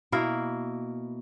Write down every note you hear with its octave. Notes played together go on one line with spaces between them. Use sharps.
B2 A#3 E4 F5